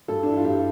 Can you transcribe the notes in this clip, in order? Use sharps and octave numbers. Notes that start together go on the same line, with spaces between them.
G2 A4
D4
E3 E4
F4
G2 G4